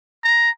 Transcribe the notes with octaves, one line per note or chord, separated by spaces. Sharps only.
A#5